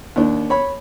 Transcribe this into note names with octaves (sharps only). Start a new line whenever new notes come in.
D#2 D4
C#5 B5